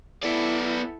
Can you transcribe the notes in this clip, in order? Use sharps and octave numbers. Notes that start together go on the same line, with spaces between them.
B3 E4 A4 D5